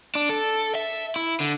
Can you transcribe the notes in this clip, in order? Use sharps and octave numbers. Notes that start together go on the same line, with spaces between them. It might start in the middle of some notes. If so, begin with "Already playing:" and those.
D4
A4
E5
E4
D3